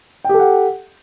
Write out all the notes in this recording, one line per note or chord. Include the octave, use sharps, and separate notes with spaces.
G4 A4 F#5 G5